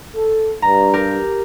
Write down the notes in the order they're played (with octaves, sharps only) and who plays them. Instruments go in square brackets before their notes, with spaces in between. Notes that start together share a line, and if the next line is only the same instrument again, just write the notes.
[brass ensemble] A4
[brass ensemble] G2 [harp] A#5
[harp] G4 A#4